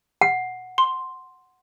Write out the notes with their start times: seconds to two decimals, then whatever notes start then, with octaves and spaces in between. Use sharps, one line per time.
0.21 F#5
0.78 C6